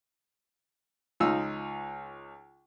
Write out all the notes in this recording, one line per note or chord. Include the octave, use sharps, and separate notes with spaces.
C#2 D#4 F4 E6